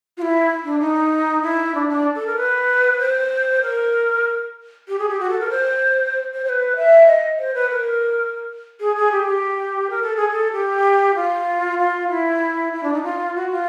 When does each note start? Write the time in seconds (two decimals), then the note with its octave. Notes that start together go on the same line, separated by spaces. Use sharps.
0.17 F4
0.22 E4
0.65 D4
0.80 D#4
1.42 E4
1.75 D4
1.89 D4
2.15 A4
2.27 A#4
2.37 B4
2.99 C5
3.62 A#4
4.88 G4
4.99 G#4
5.09 G4
5.20 F#4
5.30 A4
5.40 A#4
5.50 C5
6.34 C5
6.44 C5
6.49 B4
6.76 E5
7.07 D#5
7.39 C5
7.54 B4
7.71 A#4
8.80 G#4
8.96 G#4
9.12 G4
9.23 G#4
9.27 G4
9.90 A#4
10.02 A4
10.16 G#4
10.29 A4
10.53 G4
11.15 F4
11.79 F4
12.09 E4
12.73 E4
12.83 D4
12.93 D#4
13.03 F4
13.36 F#4
13.51 F4